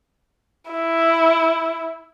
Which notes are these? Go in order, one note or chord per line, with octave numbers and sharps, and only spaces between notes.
E4